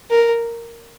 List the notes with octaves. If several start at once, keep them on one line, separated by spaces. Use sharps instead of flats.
A#4